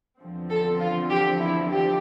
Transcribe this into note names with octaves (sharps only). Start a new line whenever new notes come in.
E2 D3 F3 C4
A4
F4
G4
E4
G4